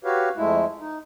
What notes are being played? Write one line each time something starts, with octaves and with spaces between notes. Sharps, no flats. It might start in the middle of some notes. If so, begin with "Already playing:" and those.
F#4 G4 B4 C#5 F5
F2 G#3 A3 E4
D#4